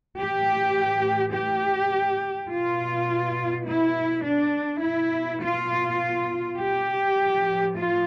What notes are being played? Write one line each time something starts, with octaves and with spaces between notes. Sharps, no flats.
A2 E3 G4
G4
B2 F4
E4
D4
B2 E4
F4
G4
A2 F3
F4